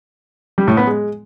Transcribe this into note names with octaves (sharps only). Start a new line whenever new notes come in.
G3
A2
B3
G#3